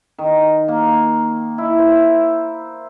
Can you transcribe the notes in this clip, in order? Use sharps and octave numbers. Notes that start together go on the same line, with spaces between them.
D#3
A#3
E4
C5